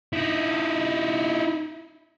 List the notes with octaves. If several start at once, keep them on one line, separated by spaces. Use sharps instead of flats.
D#4 E4